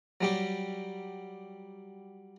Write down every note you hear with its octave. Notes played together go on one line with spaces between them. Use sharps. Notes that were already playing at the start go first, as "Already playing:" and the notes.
F#3 G3 G4